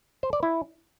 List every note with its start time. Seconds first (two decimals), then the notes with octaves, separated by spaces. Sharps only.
0.23 C5
0.33 D5
0.43 E4